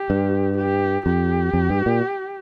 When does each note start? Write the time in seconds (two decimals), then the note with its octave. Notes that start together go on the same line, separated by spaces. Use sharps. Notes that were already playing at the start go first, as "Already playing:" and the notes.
Already playing: G4
0.10 G2
0.57 G4
1.06 F2 G4
1.53 F2
1.70 G2
1.86 A#2